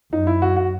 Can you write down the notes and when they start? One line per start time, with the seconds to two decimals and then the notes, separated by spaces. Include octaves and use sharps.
0.12 F#2 D#4
0.27 E4
0.42 F#4
0.56 F#4